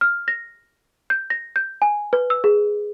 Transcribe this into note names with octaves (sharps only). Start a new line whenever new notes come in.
F6
A#6
G6
A#6
G6
G#5
B4
E6
G#4